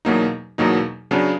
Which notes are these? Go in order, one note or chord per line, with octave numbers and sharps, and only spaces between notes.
E2 B2 F#3 A#3 D#4
E2 B2 F#3 A#3 D#4
C#3 F#3 B3 D4